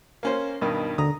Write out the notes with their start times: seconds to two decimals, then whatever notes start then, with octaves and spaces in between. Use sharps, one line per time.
0.23 A#3 C#4 C5
0.62 G2 B2 D#3
0.98 D2 A#5 D#6